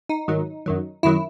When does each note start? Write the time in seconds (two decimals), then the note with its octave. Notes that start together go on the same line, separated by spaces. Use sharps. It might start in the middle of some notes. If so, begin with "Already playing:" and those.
0.09 D#4
0.28 G#2 D#3 F#3
0.66 F#2 D#3 F#3
1.03 F#2 D#3 F#3 E4